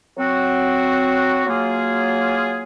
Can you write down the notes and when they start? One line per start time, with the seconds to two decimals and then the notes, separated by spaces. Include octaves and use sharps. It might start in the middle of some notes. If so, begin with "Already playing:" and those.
0.16 F#3 C4 F#4
1.45 F#3 A#3 F4 G#4